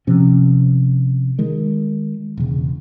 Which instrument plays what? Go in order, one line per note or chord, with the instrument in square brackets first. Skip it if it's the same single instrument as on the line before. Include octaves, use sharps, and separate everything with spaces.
[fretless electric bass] C3 F3 C#4
D#3 G#3
E1 C#3